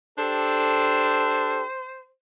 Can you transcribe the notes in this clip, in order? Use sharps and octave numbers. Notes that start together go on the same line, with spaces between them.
D4 G4 A4 C5